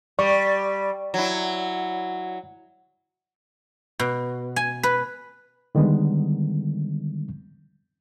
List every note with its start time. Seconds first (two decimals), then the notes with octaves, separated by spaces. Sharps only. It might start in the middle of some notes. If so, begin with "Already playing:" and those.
0.19 G3 D5 C#6
1.14 F#3 E4
4.00 B2
4.56 G#5
4.83 B4
5.75 D3 D#3 G3 G#3 B3